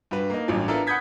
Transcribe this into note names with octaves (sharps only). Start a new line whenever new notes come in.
G2 F#4 B4
A#3 D#4
A1 G2 F#3
B3 D4 E4 F4 A4 A#4
F#5 B5 D#6 G6 G#6 B6